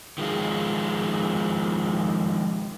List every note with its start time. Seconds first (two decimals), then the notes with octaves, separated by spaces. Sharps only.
0.18 D#3 F3 G#3 F4